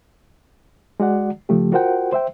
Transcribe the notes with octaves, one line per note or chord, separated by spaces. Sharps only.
G#3 F#4 D5 F#5
C#3 F3 A3 G4
F4 F#4 A#4 C5 F#5 G5
C5 E5 G5